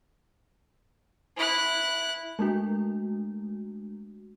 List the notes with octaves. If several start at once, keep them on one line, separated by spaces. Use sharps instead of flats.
E4 F#6
G#3 A3 D4 F#4